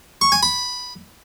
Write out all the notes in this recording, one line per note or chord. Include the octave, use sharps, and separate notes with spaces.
C#6
G#5
B5